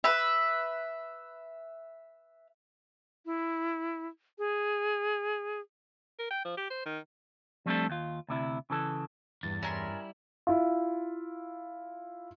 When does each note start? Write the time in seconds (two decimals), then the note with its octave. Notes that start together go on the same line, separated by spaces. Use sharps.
0.04 B4 E5
3.25 E4
4.38 G#4
6.19 A#4
6.31 G5
6.45 F3
6.57 G4
6.70 C5
6.86 D#3
7.66 F3 G3 A3 C4 D4 A4
7.90 D#2 F4
8.29 D2 C3 E4
8.70 C#3 E3 A4
9.43 E2 G2 A6
9.63 G3 C#4 E4 A#4 C6
10.47 E4 F4